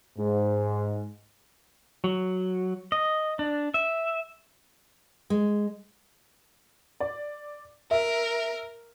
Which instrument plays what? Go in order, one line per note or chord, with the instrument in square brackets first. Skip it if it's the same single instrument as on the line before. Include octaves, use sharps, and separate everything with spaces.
[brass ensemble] G#2
[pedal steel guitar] F#3
D#5
D4
E5
[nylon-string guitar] G#3
[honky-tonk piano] D5
[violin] A#4 [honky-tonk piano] E5